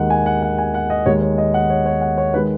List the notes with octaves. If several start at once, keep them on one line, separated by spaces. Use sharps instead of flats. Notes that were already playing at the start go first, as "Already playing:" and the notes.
Already playing: D#2 D#3 G#3 F#5
G#5
F#5
F#5
G#5
F#5
D#5
D#2 D#3 G#3 C#5
C#5
D#5
F#5
C#5
C#5
F#5
C#5
D#3 G#3 B4